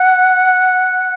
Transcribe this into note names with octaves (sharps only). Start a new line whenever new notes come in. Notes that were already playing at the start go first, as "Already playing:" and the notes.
Already playing: F#5